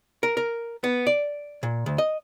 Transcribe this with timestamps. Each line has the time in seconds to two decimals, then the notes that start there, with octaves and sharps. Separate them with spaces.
0.23 A#4
0.37 A#4
0.84 B3
1.07 D5
1.63 A#2
1.86 D2
1.98 D#5